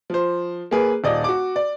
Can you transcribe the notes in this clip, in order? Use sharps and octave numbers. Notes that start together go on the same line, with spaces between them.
F3 C5
A#3 G#4 B4
D#1 D5 D#5
F#4 D6
D5